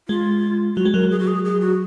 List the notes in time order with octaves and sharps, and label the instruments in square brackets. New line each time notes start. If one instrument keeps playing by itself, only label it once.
[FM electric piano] G#3 [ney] F4
[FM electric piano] F#3 [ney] F#4
[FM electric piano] G#3
[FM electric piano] F#3 [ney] A#4
[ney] G#4
F#4
G#4
G#4
F#4